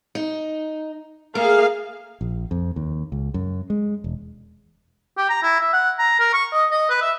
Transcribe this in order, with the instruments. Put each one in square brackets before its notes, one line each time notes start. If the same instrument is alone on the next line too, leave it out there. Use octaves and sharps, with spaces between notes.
[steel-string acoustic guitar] D#4
[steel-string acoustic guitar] A3 [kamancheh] A#3 [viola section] G#4 F5
[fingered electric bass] A#1
F2
D#2
C#2
F#2
G#3
E1
[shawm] G4
A#5
E4
E5
F#5
A#5
A#4
C#6
D#5
D#5
B4
E5